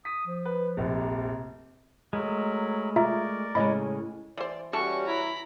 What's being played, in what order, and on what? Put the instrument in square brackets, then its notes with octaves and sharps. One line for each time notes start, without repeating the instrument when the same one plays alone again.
[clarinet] D#6 [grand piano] B6
[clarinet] F3
[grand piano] B4
F1 A#1
[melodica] F#3 A#4 B5 [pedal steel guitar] G#3 A3
[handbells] F4 E5 A#5 [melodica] A#4 D5
[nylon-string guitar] A2 C#3 G#3 [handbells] D#5 B5
[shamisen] E3 C5 [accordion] D5
[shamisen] E3 A4 A5 [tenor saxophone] G3 [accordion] C#4 F#4 [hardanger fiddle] C#6
[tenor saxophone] E4 [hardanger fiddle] A#5 B5